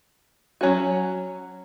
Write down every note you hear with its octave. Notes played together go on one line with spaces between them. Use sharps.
F#3 C#4 F#4